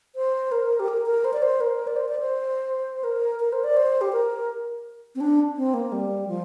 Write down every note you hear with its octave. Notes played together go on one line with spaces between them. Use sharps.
C5
A#4
G4
A#4
A#4
C5
D5
C5
A#4
D5
C5
D5
C5
A#4
A#4
C5
D5
C5
G4
A#4
C4
D4
C4
A#3
G3
F3